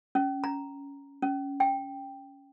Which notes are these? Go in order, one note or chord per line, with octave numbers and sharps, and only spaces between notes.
C#4
A#5
C#4
G5